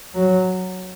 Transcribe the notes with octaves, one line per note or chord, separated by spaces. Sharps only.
F#3